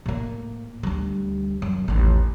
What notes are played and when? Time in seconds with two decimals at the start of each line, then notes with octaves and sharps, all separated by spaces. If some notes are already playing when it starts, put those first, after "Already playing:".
0.06 A2 A#3
0.83 D2 G3
1.62 F#2
1.88 A1 D#2